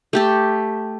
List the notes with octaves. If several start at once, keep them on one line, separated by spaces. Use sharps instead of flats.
A3 G4 A4